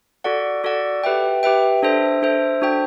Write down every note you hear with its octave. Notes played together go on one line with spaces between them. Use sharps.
F#4 A4 D5 F#5
F#4 A4 D5 F#5
G4 B4 E5 G5
G4 B4 E5 G5
D4 A4 C5 E5
D4 A4 C5 E5
D4 F#4 C5 G5